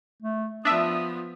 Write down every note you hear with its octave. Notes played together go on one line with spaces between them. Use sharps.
A3
F3 B3 D4 E5 D#6